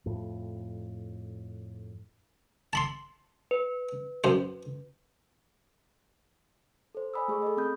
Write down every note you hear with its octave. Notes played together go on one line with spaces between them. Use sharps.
F2 A2
A5 B5 C6
B4
F#2 C5
A4 C5
D5 G#5 B5 D#6 E6
A3 G#4 B5 C#6
A4 D#5
C4 B5 D#6 G6